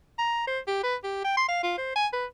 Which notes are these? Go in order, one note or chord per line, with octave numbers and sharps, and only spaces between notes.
A#5
C5
G4
B4
G4
G5
C6
F5
F4
C5
G#5
B4